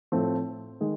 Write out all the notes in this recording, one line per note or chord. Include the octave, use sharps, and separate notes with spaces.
A2 F3 A3 C4
D#3 G#3